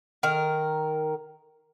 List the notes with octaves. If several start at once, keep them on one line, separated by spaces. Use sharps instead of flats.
D#3 A#4